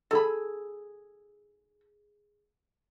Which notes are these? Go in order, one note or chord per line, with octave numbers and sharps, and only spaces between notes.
G#4 A4 B5 E6